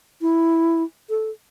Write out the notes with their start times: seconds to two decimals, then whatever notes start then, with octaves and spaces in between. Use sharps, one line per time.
0.22 E4
1.10 A4